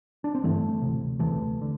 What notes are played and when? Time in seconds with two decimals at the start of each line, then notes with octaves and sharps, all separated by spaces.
0.24 D4
0.35 C4
0.43 A1 G2 D3 E3 A3
0.81 D2 C3
1.19 E1 D2 C3 E3 A3
1.61 D3